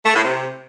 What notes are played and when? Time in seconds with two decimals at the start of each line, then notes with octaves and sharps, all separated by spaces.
0.05 A3
0.15 A2
0.24 C3